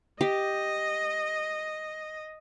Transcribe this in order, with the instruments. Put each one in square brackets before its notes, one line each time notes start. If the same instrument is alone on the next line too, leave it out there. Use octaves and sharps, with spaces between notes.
[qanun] G4 [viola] D#5